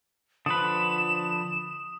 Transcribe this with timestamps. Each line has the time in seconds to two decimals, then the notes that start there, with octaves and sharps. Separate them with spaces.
0.46 D3 F3 B4 D#6 E7